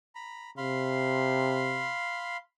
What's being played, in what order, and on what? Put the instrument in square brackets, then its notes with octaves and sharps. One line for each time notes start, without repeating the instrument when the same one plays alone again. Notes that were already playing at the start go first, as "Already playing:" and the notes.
[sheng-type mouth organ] A#5 B5
[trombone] C3 [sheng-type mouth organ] F5 B5 C6